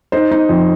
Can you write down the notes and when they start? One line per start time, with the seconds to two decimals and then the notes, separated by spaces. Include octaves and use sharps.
0.12 D#4 C5
0.31 D#4
0.49 F2